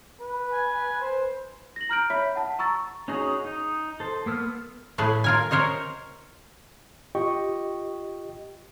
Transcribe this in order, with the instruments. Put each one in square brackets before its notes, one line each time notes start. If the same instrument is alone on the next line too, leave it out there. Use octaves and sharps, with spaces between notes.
[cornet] B4
[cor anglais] G#5
C5
[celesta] A#6 F#7
A#5 F6 G6 D7
C#5 E5 B5 B6
F#5 A5
A#5 C#6 E6 A6
[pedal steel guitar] C#4 D#4 F#4 G#4 A#5
D#4
A4 C5
A#3 B3 E6 F6
[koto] A2 A3 G#4 B4
F4 A#4 G#5
A#4 C5 C#5 D#5
[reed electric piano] F4 G4 D#5 G5 C#6